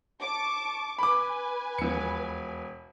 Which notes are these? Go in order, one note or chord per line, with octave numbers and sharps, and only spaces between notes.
A5 C#6 D6
B4 G#5 B5 D6
E1 D#2 F3 C#7